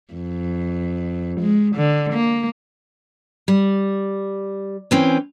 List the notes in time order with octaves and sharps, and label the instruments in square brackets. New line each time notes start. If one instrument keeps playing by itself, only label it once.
[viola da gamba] F2
G#3
D3
A#3
[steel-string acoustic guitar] G3
E3 C4 C#4